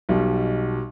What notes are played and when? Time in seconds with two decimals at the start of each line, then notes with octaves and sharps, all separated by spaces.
0.09 B1 B2 G3